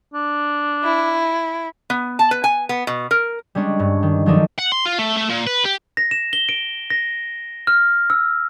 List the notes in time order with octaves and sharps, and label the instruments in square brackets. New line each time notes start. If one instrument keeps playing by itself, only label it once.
[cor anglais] D4
[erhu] E4
[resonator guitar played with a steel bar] B3
A5
B4
G#5
B3
B2
A#4
[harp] G3 G#3 C#4 D4
G2
D#3
D#3 F3 F#3 A3 D4 D#4
[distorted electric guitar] F#5
C6
F4
A3
A3
A#2
B4
G4
[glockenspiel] A#6
E7
G7
D7
A#6
F6
E6